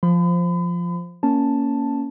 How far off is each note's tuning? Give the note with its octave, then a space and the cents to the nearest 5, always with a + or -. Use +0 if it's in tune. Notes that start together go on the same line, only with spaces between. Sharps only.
F3 +0 B5 +40
A#3 +0 C#4 +5 A5 +0